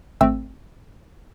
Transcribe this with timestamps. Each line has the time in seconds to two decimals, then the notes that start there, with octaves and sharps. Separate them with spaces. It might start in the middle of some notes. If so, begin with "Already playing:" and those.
0.21 G#1 A3 C4 E6